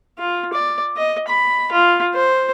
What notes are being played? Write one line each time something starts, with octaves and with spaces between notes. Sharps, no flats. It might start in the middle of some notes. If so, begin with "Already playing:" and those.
F4
D5
D#5
B5
F4
C5